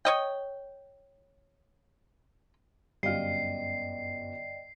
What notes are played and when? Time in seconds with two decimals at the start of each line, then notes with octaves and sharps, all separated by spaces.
0.05 C#5 D#5 G5
3.03 G1 F#2 G3 D5 D#5 F5 G5 C7